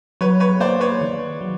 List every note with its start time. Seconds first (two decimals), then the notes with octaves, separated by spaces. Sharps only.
0.21 F#3 B4 C#5
0.40 B4 C#5
0.60 A#3 C5 D5
0.80 B4 C#5
1.01 D#3
1.41 F#3